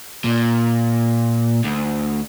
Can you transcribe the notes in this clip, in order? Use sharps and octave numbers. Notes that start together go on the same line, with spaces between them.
A#2
D2